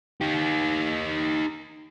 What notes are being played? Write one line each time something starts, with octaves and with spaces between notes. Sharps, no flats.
D#4 G4